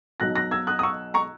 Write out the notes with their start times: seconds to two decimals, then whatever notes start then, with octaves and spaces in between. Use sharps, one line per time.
0.20 B1 B2 F#3 F#6 A#6
0.35 F#6 A#6
0.51 E6 G#6
0.67 D#6 F#6
0.79 D#6
0.83 C#6 E6
1.14 A#5 C#6